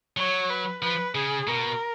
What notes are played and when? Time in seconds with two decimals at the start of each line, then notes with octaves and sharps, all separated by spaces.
0.17 F#3 C#5
0.50 B4
0.82 F3 B4
1.15 C#3 G#4
1.47 B2 A#4